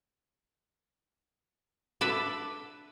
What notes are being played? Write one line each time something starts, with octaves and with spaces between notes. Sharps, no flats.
D4 A4 B4 E5